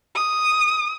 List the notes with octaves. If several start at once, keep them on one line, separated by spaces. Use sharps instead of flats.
D#6